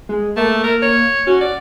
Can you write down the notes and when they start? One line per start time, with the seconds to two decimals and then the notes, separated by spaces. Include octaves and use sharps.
0.09 G#3
0.37 A3 A#3
0.64 A#4
0.83 C#5
1.27 C#4 F#4
1.41 D5